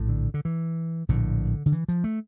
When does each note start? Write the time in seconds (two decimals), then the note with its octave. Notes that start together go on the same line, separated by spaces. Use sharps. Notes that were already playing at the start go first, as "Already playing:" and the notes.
Already playing: A#1 A2
0.09 D3
0.34 D3
0.45 E3
1.09 A#1 A2 D3
1.66 D3
1.72 E3
1.89 F3
2.04 A3